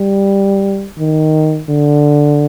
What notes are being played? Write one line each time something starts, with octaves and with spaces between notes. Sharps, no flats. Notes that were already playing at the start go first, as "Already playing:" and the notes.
Already playing: G3
D#3
D3